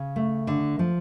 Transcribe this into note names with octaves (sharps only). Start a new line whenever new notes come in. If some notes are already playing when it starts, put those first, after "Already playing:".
Already playing: C#3
A3
D3
F3